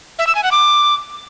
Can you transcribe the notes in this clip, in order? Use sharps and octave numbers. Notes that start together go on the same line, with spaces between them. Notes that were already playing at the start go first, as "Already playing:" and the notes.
E5
E6
G#5
F#5
D6